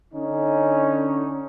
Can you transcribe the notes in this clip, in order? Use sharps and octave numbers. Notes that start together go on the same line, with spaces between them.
D3 C#4 D#4